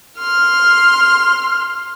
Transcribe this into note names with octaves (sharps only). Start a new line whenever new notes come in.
C6 F6